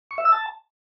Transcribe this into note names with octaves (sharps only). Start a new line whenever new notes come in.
C#6
E5
E6
A5